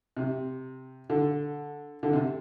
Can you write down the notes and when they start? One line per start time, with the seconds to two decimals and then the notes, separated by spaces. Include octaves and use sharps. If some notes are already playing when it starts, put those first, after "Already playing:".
0.17 C3
1.10 D3
2.03 D3
2.13 C3